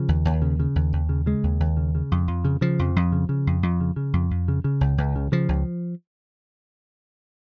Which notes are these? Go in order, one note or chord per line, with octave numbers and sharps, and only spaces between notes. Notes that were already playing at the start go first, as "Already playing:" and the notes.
Already playing: C#3 F3
D#2
D#2
C#3
C#3
D#2
D#2
C#3
C#3 G#3
D#2
D#2
C#3
C#3
F2
F2
C#3
C#3 F3
F2
F2
C#3
C#3
F2
F2
C#3
C#3
F2
F2
C#3
C#3
C#2
C#2
C#3
C#3 F3
C#2